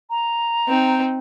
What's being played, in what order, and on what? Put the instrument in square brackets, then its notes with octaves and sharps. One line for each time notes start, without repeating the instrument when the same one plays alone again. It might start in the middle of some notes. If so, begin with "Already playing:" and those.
[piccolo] A#5
[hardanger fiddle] C4 D#4